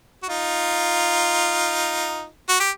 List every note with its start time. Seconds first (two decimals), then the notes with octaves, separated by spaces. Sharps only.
0.23 F#4
0.29 D#4 F4
2.49 F#4
2.60 G4